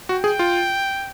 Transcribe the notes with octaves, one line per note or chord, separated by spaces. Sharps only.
F#4 G5
G#4
F4